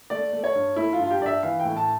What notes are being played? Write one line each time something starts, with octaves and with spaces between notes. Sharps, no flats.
A3 D5
A3
C#5
G2
A3 E4
F4
G2
F4
G4
G2 D5
E5
E3 F5
G5
A2
A5